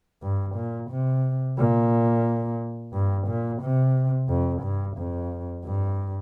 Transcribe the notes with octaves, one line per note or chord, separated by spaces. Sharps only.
G2
A#2
C3
A#2
G2
A#2
C3
F2
G2
F2
G2